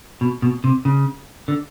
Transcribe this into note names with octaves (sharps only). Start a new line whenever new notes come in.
B2
B2
C3
C#3
D3